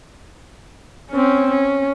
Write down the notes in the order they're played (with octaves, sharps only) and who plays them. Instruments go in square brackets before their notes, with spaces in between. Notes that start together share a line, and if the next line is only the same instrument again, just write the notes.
[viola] C4 C#4
C#4